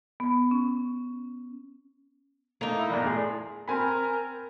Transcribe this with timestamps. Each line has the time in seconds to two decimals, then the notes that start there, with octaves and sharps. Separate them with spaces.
0.20 B3
0.51 C#4
2.61 A3 A#3 D#4
2.76 E4
2.90 A#1 E2 D5
3.05 A2 G#4 C6
3.68 C4 A#4 G#5 B5